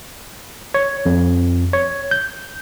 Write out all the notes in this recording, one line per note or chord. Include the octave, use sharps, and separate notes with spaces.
C#5
F2
C#5
G6